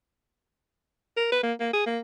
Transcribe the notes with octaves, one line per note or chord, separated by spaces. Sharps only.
A#4
B4
A#3
A#3
G#4
A#3